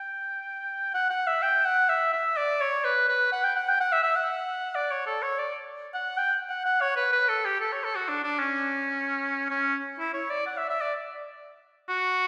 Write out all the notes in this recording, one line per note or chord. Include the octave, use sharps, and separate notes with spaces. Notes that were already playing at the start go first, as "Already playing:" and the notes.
Already playing: G5
F#5
F#5
E5
G5
F#5
E5
E5
D5
C#5
B4
B4
F#5
G5
F#5
G5
F#5
E5
E5
F#5
D5
C#5
A4
C#5
D5
F#5
G5
F#5
F#5
C#5
B4
B4
A4
G4
A4
C#5
A4
F#4
D4
D4
C#4
C#4
E4
C#5
D5
F#5
E5
E5
D5
F#4